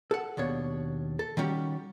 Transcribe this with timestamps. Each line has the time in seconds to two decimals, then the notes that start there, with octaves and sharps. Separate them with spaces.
0.11 A4 F#5
0.37 D#2 B2 D4 C#5
1.19 A4
1.37 D#3 G3 C#4 F#4 G4